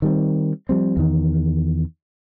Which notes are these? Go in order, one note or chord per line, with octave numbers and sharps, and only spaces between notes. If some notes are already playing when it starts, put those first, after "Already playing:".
D#3 G3 C4
F3 G3 C4
E2 D#3